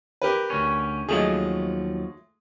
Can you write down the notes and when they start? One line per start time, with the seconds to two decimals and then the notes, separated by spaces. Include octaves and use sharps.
0.22 G4 A#4 B4
0.50 D2 C#4
1.09 D#2 F3 F#3 G#3 A3 G#4